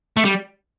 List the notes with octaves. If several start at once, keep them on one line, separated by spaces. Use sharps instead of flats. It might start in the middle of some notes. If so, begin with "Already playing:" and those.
A3
G3